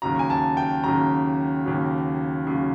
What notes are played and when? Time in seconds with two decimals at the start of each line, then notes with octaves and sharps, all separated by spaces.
0.02 D#2 C#3 F#3 A#5
0.19 G#5
0.30 A5
0.57 G5
0.84 D#2 C#3 F#3 A#5
1.65 D#2 C#3 F#3
2.47 D#2 C#3 F#3